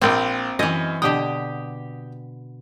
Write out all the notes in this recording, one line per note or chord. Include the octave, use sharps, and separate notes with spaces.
A#1 A#3 C4 G5
F#2 E3 D#5
B2 D3 G4 G5 D#6